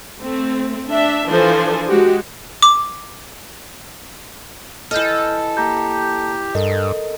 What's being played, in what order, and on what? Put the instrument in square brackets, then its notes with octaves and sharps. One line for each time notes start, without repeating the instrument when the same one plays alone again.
[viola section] A3 C4
D4 E5
E3 F3 D4 A4 C5 G#5
G#3 F#4 G4
[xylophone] D6
[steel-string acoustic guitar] E3 D#5 [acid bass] A4 [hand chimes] F6 G6
[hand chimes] A#3 A#5 G6 [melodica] G4
[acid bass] G2 [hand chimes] A4 A#4 D#5